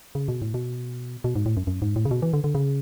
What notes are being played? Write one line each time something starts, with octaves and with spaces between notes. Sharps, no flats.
C#3
B2
A2
B2
B2
G#2
A2
F#2
F#2
G#2
A2
C#3
B2
E3
D3
D3
C#3